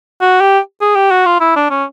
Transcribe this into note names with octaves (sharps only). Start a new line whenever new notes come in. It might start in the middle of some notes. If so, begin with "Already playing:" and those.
F#4
G4
G#4
G4
F#4
F4
E4
D4
C#4